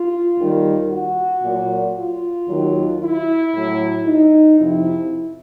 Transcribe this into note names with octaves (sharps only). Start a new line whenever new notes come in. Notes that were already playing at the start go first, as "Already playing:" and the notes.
Already playing: F4
D#2 D#3 G3
F#4
A#2 F#3
F4
D#2 D#3 F#3
E4
A2 F#3
D#4
F2 C3 F3 E4